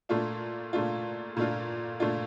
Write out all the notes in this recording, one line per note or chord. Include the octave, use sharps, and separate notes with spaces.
A#2 A3 D4 F4
A#2 A3 D4 F4
A#2 A3 D4 F4
A#2 A3 D4 F4